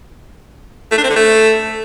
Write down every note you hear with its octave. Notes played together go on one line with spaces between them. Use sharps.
A3
D4
C4
D3
A3